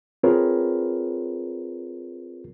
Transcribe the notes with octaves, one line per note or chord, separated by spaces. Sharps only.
C4 F4 G#4 A#4 B4 C#5